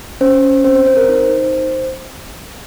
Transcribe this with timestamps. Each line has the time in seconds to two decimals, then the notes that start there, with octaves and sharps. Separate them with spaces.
0.21 C#4 C5
0.43 C#4
0.64 C4 C5
0.75 C5
0.86 C4 C5
0.97 A#4
1.08 D#4 C5
1.30 D#4